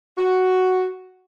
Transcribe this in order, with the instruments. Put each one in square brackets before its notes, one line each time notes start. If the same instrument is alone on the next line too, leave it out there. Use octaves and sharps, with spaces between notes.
[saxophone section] F#4